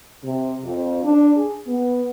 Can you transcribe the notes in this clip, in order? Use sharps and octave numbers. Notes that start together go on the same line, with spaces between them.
C3
F2
D4
G#4
B3